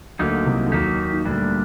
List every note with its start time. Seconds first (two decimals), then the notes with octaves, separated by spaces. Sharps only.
0.19 D2 D3 F#3 A#3 D#4 G4
0.46 C2 C3
0.66 D3
0.72 D#2 D#3 F#3 A#3 D#4 G4
1.13 D#3
1.25 D2 A#2 D3 G3 D4